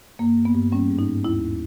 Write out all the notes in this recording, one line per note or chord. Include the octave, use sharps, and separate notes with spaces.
G2 A#3
G2
B3
G2
G3 C#4
G#2
D#4
G#2
D#2 E4